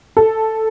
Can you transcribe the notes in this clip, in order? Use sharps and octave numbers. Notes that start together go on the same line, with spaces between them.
A4